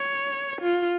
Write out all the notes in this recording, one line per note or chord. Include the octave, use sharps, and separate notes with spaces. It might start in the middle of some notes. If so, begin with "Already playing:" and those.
Already playing: C#5
F4